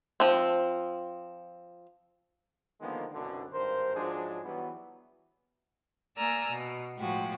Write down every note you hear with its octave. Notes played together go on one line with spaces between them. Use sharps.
F3 C4
D3 D#3 F3 G#3 A#3 B3
C2 F#2 B2 D3
G#1 G2 A#4 C5
G#2 F3 F#3 G#3 D4 G#4
E3 F#3 G3 B3
A#3 D5 G#5 A#5 E6 F6
B2
A2 F3 G#3 F#4 G4